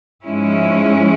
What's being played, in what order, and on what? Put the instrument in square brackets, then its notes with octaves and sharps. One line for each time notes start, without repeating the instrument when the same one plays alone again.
[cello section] G#2 F3 G#3 C#4 E4